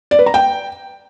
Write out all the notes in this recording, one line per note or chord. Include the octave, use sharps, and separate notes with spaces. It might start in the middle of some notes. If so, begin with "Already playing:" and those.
D5
B4
A#5
G5